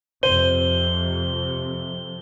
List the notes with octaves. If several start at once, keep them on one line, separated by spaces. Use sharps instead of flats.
F2 C3 C5 D#7 G7